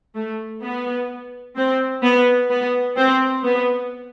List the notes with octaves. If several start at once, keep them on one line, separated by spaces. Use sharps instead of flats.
A3
B3
C4
B3
B3
C4
B3